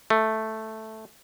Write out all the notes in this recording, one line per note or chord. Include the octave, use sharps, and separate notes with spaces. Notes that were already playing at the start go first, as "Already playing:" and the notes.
A3